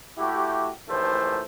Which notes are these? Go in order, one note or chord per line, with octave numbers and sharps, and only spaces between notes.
A3 E4 F#4 G4
A#1 D#2 A2 E3 A3 C5